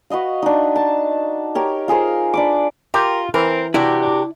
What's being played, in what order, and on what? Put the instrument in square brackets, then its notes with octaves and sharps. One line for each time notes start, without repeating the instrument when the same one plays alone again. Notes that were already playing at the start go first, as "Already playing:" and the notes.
[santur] F#4 B4 D#5 F5
D4 D#4
A5
G4 A#4 C#5
F4 G#4 A#4 C5
D4 B4 D6
[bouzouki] F4 [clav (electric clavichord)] G4 [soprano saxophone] A#4
[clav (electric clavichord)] E3 [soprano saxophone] C4 [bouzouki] A#4
[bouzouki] C3 F#4 G4 [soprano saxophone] D4 [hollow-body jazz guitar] E4 D5
[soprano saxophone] D4